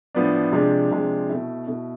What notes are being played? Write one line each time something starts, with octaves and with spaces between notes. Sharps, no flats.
A2 F3 B3 D4
C3 F3 G#3 D4
C3 F3 G#3 D4
B2 A3 E4
B2 A3 E4